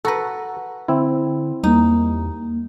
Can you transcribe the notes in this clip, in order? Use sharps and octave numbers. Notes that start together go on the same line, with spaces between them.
F#4 A4 B4 A#5
D3 C4 E4
E2 G3 A#3 D#4